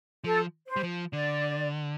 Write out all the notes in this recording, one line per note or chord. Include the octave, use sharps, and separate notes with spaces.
F3 A4
C5
G3
F3
D3 D5